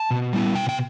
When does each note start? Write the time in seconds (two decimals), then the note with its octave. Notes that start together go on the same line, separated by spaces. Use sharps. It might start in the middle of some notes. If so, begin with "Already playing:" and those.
Already playing: A5
0.11 B2
0.33 G3 B3 E4
0.55 B2 G5
0.69 G5